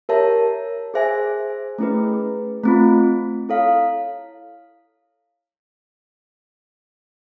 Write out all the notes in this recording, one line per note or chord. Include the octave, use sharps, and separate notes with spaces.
G4 A#4 C#5 E5 A5
G#4 C5 E5 G#5
A3 C#4 E4 G#4 B4
A3 C4 F4
E4 A4 C#5 F5